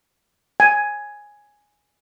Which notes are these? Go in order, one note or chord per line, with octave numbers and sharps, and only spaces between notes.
G#5